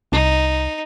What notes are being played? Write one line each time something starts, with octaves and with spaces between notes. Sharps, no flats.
C2 D#4